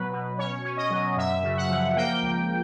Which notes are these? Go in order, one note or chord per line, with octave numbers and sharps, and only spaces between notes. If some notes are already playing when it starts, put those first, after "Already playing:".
Already playing: B2 F#3 B4
B2
C#4 C#5
C#4
D#5
F#3
F#2 E5
C#3
F#5
F3
A#3 G5
C#2